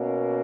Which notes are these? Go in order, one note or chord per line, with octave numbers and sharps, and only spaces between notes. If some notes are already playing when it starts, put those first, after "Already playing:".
Already playing: B2 A#3 C#4